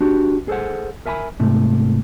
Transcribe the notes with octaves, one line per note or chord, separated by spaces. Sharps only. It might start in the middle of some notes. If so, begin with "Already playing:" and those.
D4 F#4 G4
G#4 A4 B4 C5 F#5
A#4 E5 G#5 A5 B5
G#2 C3 A3